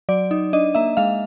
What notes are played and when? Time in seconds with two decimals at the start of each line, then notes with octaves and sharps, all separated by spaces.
0.09 F#3 D5
0.31 D#4
0.53 D4 D#5
0.75 A#3 E5
0.97 G#3 F5